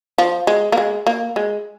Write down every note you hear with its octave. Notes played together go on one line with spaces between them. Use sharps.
F3
G#3
A#3
G#3
A#3
G#3